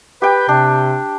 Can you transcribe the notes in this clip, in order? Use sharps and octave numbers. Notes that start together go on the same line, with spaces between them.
G4 B4 G5
C3 D4